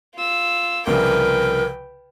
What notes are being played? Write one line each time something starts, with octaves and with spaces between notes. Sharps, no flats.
F4 E6
C2 C#3 F3 A#4 B4 G5